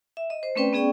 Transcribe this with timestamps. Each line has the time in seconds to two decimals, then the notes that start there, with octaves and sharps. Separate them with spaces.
0.17 E5
0.30 D#5
0.43 C5
0.55 A3 C4 C#4 B4 D5 G5
0.73 B3 C#4 G#4 D5 G5 C#6